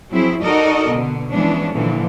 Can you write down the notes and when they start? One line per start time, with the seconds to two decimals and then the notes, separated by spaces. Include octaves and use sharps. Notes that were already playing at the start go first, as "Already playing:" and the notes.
0.11 F3 F#3 C4 E4 G#4
0.42 D#4 F#4 A4 A#4 D5 D#5
0.88 B2 D3
1.31 E3 F3 G#3 B3 C#4 D4
1.73 A#2 D3 E3 F3